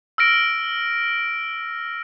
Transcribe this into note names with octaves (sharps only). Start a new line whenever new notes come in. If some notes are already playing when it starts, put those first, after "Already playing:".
E6 F6 A#6 D7